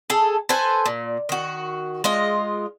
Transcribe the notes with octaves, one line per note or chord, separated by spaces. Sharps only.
G#4 A4
A4 B4 C5 G#5
A#2
D#3 F#4
G#3 F4 D#5